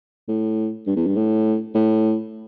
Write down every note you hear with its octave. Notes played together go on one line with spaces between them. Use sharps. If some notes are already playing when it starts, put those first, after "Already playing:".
A2
G2
E2
G2
A2
A2